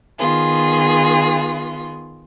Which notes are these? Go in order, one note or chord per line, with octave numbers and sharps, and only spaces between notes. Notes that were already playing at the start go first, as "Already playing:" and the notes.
D#3 B3 F4 G#4